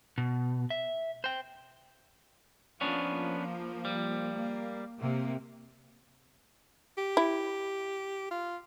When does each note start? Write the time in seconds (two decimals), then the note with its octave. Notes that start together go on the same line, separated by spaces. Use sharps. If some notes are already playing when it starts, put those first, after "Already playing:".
0.18 B2
0.70 E5
1.24 C5 G5
2.81 F3 A#3 B3 C#4 D4
3.85 G3
4.34 A#3
4.99 C3 A#3
6.97 G4
7.17 E4
8.31 F4